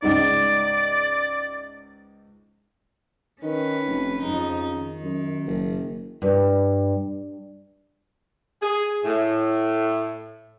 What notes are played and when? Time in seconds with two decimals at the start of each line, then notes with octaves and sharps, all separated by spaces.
0.02 C#2 G#2 D#4 D5
3.42 D#3 C#4 B4
3.87 F1
4.24 F2 C#3 D#4
4.70 D#3
5.01 F#2
5.46 F#1
6.22 G2
8.62 G#4
9.04 A2